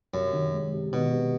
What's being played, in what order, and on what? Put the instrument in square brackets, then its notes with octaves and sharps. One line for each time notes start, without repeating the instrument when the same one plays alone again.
[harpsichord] F#2 [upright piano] C3
[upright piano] D#3
G#3
C3
[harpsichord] B2 [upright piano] D#3
[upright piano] C3